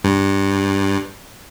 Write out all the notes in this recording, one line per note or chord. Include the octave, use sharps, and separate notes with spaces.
G2